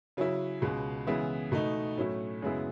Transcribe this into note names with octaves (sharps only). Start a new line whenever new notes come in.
C#3 F#3 C#4 E4
C#2 B2 G#3
C#3 E3 G#3 B3 E4
B2 A3 D#4
A2 F#3 A3 C#4 E4
F#2 C#3 G#3 B3 E4